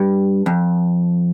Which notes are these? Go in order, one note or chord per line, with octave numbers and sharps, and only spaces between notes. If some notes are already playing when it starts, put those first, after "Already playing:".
Already playing: G2
F2